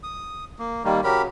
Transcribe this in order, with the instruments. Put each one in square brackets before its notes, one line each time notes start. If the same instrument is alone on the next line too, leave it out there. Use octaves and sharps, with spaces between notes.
[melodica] D#6
A#3
[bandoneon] D#3 G3 A#3 [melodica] A#4
[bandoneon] C#3 F#3 [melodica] G4 A#4 B5